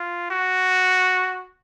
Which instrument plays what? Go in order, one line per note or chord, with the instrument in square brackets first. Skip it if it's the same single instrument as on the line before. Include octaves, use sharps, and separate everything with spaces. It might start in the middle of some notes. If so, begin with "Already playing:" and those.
Already playing: [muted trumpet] F4
F#4